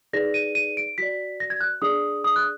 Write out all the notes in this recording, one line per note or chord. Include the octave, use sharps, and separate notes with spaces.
D#4 G#4 B4 D5 A#6
D#7
D#7
D7
F#4 D5 B6
A#6
G#6
F#6
D4 G#4 D5 D#6
D#6
F#6